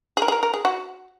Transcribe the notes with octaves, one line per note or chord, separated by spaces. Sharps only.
G#4
A#4
G#4
A#4
A#4
G#4
F#4